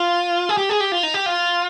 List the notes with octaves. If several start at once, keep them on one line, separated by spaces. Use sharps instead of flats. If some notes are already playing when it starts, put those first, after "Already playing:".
Already playing: F4
G#4
G4
G#4
G4
F4
D#4
G4
F4